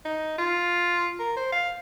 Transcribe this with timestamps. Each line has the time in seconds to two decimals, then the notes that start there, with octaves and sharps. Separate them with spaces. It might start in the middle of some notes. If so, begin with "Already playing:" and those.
0.05 D#4
0.38 F4
1.19 A#4
1.37 C5
1.52 F5